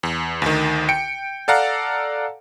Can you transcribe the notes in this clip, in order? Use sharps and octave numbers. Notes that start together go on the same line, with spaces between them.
E2
D2 D#3
G5 C#7 D7
A4 D5 F5 F#5 A#5